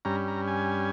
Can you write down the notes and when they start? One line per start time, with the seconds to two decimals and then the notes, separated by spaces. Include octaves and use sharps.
0.05 G2 G3 C#4 A#5
0.28 A#5
0.48 G#5